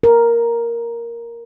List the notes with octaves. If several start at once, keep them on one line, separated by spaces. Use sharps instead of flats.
A#4